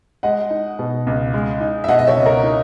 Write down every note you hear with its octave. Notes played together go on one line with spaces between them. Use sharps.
G#3 D#5 F#5
D#4
B2
C#2
G#3
D#4
E5
B2 D#5 F#5
D#5
C#5 E5
C#2
A#4 C#5
D#4